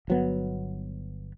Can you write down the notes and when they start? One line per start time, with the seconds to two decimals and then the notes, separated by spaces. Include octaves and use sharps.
0.08 G1 F#3 B3